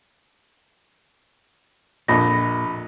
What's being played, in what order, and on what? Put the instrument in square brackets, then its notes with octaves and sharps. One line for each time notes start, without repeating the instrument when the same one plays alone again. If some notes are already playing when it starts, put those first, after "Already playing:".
[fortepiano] A#1 F2 [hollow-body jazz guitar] A#2 [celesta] B5 A#6